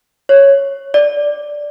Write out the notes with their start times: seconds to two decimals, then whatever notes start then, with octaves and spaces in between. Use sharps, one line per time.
0.29 C#5
0.94 D5